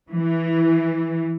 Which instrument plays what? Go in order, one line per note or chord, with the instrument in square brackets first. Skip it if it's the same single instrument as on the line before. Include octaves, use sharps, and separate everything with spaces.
[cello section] E3